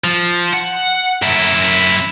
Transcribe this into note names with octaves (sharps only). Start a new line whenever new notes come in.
F3
F#5
F#2 E4